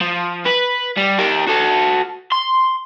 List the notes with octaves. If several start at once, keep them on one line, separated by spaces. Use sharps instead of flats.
F3
B4
G3
G4 A#4
F#4 A4
C6